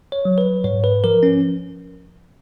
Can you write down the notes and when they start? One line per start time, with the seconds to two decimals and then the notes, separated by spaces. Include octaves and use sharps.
0.12 C#5
0.25 F#3
0.38 B4
0.64 G#2 C#5
0.84 B4
1.04 F3 A#4
1.23 C#4